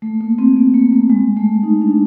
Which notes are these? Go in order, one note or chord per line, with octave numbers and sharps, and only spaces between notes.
A3
A#3
C4
B3
A#3
A3
G#3
A3
D#4
D4